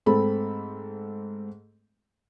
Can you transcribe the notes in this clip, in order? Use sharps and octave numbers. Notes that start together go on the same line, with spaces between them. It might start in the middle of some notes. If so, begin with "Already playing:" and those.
G#2 A3 C4 A4 B5